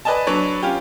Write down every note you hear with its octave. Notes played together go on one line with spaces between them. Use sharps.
B4 D5 D#5 G#5 A5
F#3 D4 B4 C#5
C#4 F4 G4